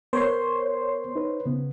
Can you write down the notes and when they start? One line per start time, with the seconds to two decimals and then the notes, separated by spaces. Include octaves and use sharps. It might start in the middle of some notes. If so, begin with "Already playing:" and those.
0.13 B3 A#4 C5 C#5 C6
1.15 D#4 B4
1.46 C#3 B3